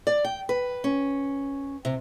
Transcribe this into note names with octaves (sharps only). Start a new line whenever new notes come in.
D5
G5
B4
C#4
C3